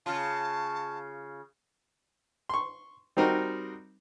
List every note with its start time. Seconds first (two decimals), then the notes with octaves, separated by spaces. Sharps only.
0.06 C#3 F4 A5
2.49 C6 C#6
3.17 G3 C4 D#4 F#4 A#4